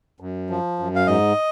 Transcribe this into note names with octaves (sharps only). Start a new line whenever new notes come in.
F#2
F3
F#2
F5
G#2 D#5